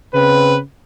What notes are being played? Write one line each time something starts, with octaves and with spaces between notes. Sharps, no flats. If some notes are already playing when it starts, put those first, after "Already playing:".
C#3 C4 B4